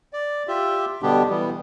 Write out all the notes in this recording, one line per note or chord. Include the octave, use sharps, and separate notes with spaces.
D5
F4 G4 E5
B2 D3 G3 B3 D4 G4
E3 G3 B3